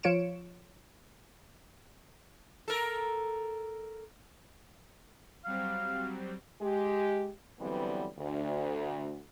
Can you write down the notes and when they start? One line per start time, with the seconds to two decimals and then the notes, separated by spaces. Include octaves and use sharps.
0.03 F3 F4 C#5 C#7 D7 E7
2.68 A4 A#4
5.45 F#3 G3 C4 F5
6.62 G#3 G4
7.60 D3 E3 F#3 G3 B3 C4
8.18 D2